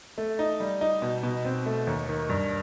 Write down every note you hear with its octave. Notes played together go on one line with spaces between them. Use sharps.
A3
D#4
G3
D#4
B2
B2
C4
A3
D#2
D#3
G2